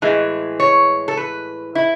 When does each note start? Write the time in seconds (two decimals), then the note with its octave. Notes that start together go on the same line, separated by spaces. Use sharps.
0.02 A2 E3 G#3
0.60 C#5
1.08 A4
1.17 B4
1.75 E4